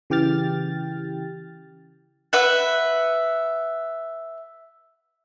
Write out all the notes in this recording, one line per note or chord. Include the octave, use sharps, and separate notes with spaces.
C#3 E3 G4 G5 F6 A6
B4 E5 F#5